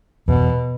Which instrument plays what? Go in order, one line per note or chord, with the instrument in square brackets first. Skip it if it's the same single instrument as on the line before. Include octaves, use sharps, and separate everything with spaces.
[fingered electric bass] E2 [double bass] B2